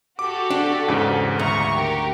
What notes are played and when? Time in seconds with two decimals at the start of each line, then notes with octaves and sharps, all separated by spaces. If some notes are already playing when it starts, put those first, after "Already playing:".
0.19 F#4 G4 A4 D6
0.51 D4
0.88 E2 G#2 C#3
1.39 D2 A#5 C#6
1.73 G4 A#4